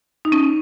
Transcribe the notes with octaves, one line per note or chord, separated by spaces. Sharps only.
D#4
C#4